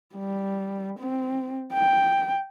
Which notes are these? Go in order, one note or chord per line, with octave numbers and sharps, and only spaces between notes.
G3
C4
G5